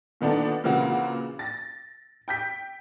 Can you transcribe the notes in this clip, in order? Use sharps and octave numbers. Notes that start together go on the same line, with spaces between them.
A#2 D#3 B3 D4 A4
A#2 C#3 E3 A#3 C4 F#4
A6 A#6
G5 G6 B6